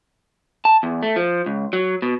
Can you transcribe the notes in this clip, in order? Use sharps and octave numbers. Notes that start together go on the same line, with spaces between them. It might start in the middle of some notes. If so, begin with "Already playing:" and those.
A5
E2
A3
F3
C#2
F#3
B2